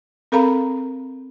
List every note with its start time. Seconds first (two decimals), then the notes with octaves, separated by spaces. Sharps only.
0.32 C4 A4 A#4 F5 A#5 B5